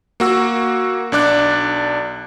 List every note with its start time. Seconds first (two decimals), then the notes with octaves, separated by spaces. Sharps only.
0.20 A#3 F#4 E6
1.12 B1 D4 D5 F#6